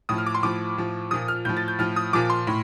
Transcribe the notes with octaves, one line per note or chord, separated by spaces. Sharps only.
A2 F3 D#6
F6
D6
C6
A2 F3 D6
A2 F3
A#2 F3 D#6
F6
A2 F3 G6
A6
G6
A2 F3 F6
D#6
A#2 F3 D6
C6
A2